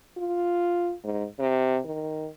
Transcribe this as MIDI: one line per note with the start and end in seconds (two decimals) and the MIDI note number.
0.17 0.93 65
1.04 1.26 44
1.39 1.79 48
1.85 2.29 51